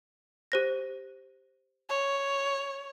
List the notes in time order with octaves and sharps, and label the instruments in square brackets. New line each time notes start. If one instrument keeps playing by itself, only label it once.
[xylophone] G4 C5 A#6
[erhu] C#5